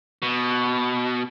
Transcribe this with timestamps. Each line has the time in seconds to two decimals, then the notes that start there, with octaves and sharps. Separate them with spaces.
0.22 B2